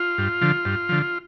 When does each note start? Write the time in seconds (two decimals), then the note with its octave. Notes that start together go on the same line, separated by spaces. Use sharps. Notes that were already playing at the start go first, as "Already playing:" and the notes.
Already playing: F4
0.18 G2
0.41 D3 F3
0.65 G2
0.89 D3 F3